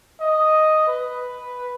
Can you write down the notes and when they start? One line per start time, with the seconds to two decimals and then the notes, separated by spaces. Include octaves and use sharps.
0.21 D#5
0.87 B4